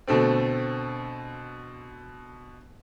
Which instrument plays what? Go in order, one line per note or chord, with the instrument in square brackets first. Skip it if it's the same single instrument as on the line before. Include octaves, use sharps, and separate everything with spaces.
[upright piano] B2 D3 A3 C4